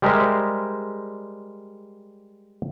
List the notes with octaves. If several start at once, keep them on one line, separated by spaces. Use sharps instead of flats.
G3 G#3 G4 A#4 C5 E5